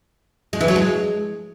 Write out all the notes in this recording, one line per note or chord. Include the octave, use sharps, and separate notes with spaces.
G#3
E3
F#3
G#3